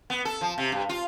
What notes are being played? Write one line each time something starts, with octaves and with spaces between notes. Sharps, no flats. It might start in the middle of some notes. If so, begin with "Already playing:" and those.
B3
A4
F3
C3
G2
F4